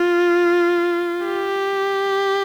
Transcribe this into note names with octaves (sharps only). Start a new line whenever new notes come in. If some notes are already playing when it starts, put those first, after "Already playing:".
Already playing: F4
G4